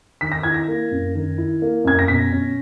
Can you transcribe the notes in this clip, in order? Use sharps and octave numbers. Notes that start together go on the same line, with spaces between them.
D#3 B6
A#6
E4 G#6
A#6
A#3
F#2
D#3
E4
A#3
F#2 G#6
A#6
B2 B6
C#4